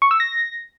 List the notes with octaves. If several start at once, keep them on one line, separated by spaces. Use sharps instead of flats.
C#6
E6
A#6